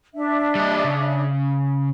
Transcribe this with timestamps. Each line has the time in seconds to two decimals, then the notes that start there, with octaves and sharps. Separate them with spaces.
0.15 D4 E5
0.55 G3 D#5
0.85 C#3